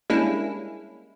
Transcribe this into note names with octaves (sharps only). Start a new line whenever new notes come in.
G3 G#3 A#3 C#4 D4 E4